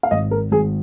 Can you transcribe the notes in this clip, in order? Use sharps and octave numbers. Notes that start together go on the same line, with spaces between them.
F5
G#1 D#5
A#4
G#1 G#4